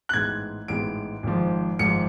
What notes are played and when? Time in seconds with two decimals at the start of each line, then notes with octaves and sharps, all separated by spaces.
0.09 F#6
0.13 A1 G#2 G#3 B3 G#6
0.68 A1 G#2 G#3 B3 D7
1.23 G#1 G#2 F3
1.79 G#1 G#2 F3 C#7